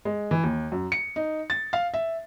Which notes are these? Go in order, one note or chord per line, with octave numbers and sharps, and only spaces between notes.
G#3
E3
D#2
F#2
C#7
D#4
A6
F5
E5